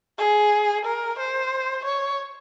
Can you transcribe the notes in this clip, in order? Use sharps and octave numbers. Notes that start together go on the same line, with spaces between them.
G#4
A#4
C5
C#5